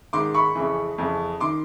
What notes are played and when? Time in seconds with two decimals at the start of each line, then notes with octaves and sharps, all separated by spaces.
0.13 G#2 D#3 C6 D6
0.34 B5 C#6
0.55 F2 C#3 E3
0.98 F2 C#3 E3
1.41 D#3 C6 D6